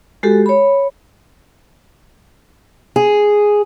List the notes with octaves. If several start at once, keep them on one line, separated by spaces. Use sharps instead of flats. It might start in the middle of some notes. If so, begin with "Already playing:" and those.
G#3 F#4 G4 A4
C#5 B5
G#4